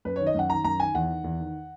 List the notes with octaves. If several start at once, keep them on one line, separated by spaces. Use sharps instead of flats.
F#2 B4
D#3 C#5
D#5
F#2 F#5
D#3 A#5
F#2 A#5
D#3 G#5
E2 F#5
D#3
E2
D#3